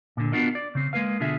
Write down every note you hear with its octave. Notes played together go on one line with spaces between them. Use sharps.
A#2 D3
B3 D4 F4 F#4 A#4 D#5
D5
C#3 C4
G#3 A#3 B4 F5
B2 D3 F4 G#4 E5